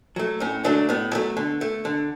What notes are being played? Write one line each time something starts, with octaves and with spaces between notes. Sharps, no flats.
F#3 A3
A2 C#4
D3 F#3 A3 D4
A2 B3
F#3 A3
D3
A3
D3